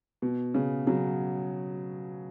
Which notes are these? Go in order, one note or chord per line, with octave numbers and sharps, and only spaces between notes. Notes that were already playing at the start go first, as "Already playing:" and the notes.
B2
C#3
C#3 F#3